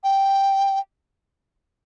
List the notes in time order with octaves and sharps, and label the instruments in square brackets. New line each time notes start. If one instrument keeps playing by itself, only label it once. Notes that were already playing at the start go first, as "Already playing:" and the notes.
[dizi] G5